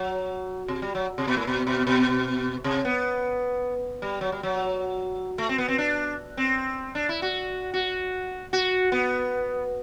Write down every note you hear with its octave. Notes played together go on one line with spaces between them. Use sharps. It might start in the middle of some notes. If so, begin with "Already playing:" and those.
Already playing: F#3
C3
G3
F#3
C3
B2
A2
B2
B2
B2
C3
B3
G3
F#3
G3
F#3
A3
C4
B3
C4
D4
C4
D4
E4
F#4
F#4
F#4
B3